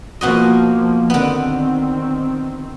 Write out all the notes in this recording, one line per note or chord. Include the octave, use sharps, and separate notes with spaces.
B2 F3 A#3 F#4 D#5
D3 D#3 B3 C4